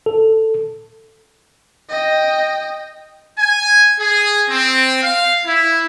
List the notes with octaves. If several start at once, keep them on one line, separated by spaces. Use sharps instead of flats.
A4
D#5 G5
G#5
G#4
C4
F5
E4